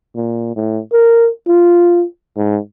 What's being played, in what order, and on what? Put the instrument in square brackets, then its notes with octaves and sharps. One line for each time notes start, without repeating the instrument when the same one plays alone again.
[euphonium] A#2
A2
A#4
F4
G#2